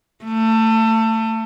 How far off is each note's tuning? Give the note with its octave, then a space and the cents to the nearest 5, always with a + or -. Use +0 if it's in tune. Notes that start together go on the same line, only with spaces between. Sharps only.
A3 +25